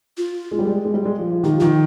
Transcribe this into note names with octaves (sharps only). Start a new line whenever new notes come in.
F4
G#3
G3
G#3
G#3
G3
G#3
F3
F3
D#3 G4
F3
D#3 F4